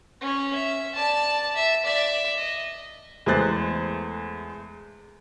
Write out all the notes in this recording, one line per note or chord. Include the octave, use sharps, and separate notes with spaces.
C#4 C#5
E5
D5 A5
E5
D5 E5
D#5
E2 G#3 A3 C5 F#6 A6